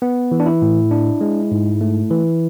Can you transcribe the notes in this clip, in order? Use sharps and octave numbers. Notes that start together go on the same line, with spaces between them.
B3
E3
D4
E4
A2
D4
G#3
G#2
A3
E3